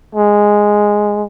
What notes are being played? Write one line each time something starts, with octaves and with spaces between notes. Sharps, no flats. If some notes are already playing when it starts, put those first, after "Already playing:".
G#3